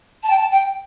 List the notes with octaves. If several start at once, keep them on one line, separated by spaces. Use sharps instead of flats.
A5
G5
A5
G5